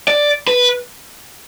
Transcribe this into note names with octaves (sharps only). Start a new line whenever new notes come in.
D5
B4